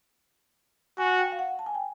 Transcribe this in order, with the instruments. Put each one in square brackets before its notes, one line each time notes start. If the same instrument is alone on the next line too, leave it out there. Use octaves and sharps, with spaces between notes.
[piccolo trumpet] F#4 [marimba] G#5
[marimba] G5
F5
F#5
A5
G#5
G5